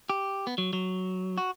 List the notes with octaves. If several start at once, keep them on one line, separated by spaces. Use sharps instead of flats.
G4
B3
F#3
F#3
F#4